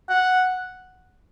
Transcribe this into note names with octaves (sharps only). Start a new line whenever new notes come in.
F#5